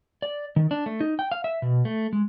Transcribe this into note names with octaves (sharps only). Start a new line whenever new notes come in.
D5
D#3
D4
A3
D#4
G5
F5
E5
B2
A3
G#3